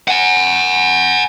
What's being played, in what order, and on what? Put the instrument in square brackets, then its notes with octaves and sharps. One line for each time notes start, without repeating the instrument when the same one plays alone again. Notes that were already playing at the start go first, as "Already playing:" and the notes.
[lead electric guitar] F#5 G#5